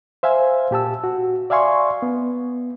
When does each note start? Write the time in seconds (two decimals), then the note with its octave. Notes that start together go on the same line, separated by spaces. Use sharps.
0.23 C5 E5 F5 G#5
0.71 A#2 G4 A5 E6
1.04 F#4
1.50 D5 E5 F5 G#5 C6 C#6
2.02 B3